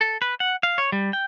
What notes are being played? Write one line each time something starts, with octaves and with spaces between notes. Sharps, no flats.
A4
B4
F#5
F5
C#5
G3
G5